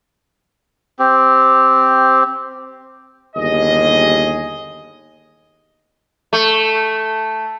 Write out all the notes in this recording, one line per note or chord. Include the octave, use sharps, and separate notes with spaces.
C4 G4
G1 D#2 G#4 D#5
A3